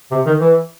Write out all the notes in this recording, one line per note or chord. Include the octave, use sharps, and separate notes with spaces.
C3
D#3
E3